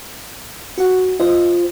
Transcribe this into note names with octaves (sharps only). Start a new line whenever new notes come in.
F#4 F#5
F4 C5 D#5